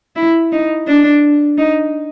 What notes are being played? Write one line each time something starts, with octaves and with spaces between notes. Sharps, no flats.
E4
D#4
D4
D#4